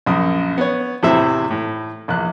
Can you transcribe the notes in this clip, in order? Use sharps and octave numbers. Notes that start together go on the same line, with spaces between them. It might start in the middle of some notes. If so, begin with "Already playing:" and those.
A#1 F#2 D#6
B3 C#5
E2 A2 C3 E4 C5 E5
A2
A#1 E2 F#6